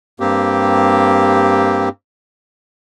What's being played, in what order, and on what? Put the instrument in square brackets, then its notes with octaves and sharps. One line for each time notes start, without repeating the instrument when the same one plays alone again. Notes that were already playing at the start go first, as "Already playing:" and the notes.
[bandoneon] G2 A#3 C4 G4